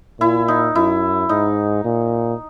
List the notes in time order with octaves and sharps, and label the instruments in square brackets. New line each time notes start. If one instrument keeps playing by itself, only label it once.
[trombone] A#2 [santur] E4
[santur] D#4
[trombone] F#2 [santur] E4
[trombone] G#2 [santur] D#4
[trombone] A#2